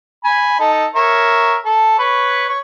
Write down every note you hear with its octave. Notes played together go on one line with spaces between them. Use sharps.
G#5 B5
D#4 A4
A#4 C#5 E5
A4
B4 C#5
C#5